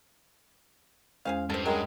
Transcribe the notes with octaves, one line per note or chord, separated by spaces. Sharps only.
E2 G#3 C#4 G#4 C5 F5
G2 A4 C5
F#3 G#3 A#4 G5